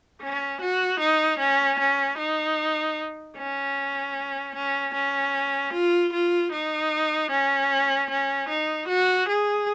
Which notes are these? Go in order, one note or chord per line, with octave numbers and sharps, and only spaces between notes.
C#4
F#4
D#4
C#4
C#4
D#4
C#4
C#4
C#4
F4
F4
D#4
C#4
C#4
D#4
F#4
G#4